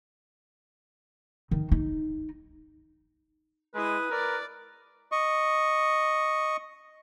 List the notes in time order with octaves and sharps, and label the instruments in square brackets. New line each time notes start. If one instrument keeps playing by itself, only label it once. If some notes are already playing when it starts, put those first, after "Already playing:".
[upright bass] D#3
D#4
[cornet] G#3 [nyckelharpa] E4 D#6 [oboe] B4
[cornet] A#4 [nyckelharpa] D5
[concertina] D#5 C#6